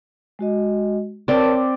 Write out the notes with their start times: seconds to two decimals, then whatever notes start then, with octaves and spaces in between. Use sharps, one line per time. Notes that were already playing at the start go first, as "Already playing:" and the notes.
0.39 G#3 F#4 D#5
1.28 C4 A#4 C#5 D5 A5
1.54 D6